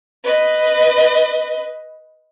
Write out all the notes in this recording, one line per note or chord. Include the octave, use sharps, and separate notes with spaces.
B4 D#5